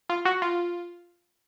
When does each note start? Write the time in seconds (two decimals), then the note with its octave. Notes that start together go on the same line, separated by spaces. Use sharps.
0.09 F4
0.25 F#4
0.42 F4